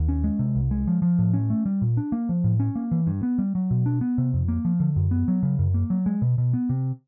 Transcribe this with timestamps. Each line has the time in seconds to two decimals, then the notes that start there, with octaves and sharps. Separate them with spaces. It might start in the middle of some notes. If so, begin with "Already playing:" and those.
Already playing: D#2
0.09 C#4
0.24 G#3
0.39 C3
0.55 C2
0.71 G#3
0.87 F3
1.02 F3
1.19 A2
1.33 C#4
1.50 A3
1.66 G3
1.82 A#2
1.97 D4
2.12 A#3
2.29 F3
2.44 A2
2.60 C#4
2.75 A#3
2.91 E3
3.07 G2
3.23 B3
3.38 G3
3.55 F#3
3.71 B2
3.86 D4
4.01 B3
4.18 C3
4.33 F2
4.48 A#3
4.65 F3
4.80 D3
4.96 F#2
5.11 B3
5.28 F#3
5.43 C#3
5.59 F#2
5.74 A#3
5.90 F#3
6.06 G#3
6.22 B2
6.38 B2
6.54 B3
6.69 C3